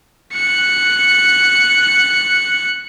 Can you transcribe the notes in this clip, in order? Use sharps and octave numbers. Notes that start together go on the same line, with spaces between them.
F#6 C#7